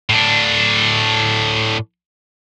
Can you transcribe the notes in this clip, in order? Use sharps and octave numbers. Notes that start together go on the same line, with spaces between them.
A2 D4